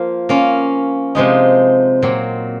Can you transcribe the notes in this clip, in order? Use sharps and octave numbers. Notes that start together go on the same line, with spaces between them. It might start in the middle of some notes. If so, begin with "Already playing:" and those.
Already playing: F3 A#3 F4 C5
A#3 C#4 F4
C3 F3 G#3 D#4
A#2 F#3 C4